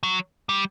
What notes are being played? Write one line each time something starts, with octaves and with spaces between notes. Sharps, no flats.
F#3
G3